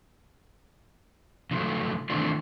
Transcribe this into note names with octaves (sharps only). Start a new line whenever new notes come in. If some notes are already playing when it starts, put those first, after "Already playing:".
C#3 F3 F#3 A3
D#3 E3 A3 C4 D4 F4